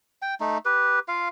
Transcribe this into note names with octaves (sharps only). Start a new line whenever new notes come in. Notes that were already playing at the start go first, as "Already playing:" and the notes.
G5
A3 D#4
G4 B4
F4 F5